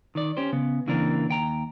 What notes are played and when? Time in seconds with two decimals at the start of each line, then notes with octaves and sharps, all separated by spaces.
0.15 D#3 D5
0.37 C#4 G4 C5
0.53 C#3 B3
0.87 C#3 E3 A#3 C4 D4 A#4
1.29 D#2 G5 A#5